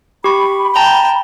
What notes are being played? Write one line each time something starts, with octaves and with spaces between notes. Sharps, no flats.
G4 B5 C#6
G5 A5 A#5